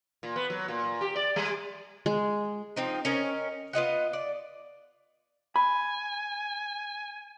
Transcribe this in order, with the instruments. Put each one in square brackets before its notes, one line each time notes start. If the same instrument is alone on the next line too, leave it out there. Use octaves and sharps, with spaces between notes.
[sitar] A#2
B3
F#3
A#2
A#2
G4
D5
G3
[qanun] G#3
[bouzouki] F3 C4 D#4
C#4 A#4 D#5
B3 F4 D#5 F#5
D5
[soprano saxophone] G#5 [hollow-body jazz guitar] B5